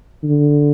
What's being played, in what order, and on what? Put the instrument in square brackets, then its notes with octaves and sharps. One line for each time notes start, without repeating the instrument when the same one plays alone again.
[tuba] D3